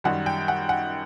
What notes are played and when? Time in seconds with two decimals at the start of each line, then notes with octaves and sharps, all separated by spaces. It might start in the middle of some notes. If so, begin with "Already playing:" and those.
0.04 F#2 D#3 G3 F#5
0.26 G5
0.48 F#5
0.69 F#5